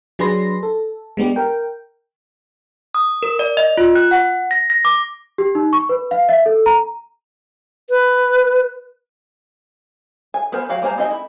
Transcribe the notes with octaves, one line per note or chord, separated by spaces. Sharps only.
F#3 D4 G#4 B4 C6 A#6
A4
G#3 B3 D4 G4
A#4 G5
D#6
A#4
D5
D#5
F4
F#6
F#5
A#6
A#6
D6
G4
D#4
C#6
B4
F5
E5
A4
A#5
B4
G#5
B3 A#4 C5 G#5
F#3 F#4 F5 G5
G3 A#3 C5 G#5 A#5
G#3 C4 D#4 D#5 G#5
E4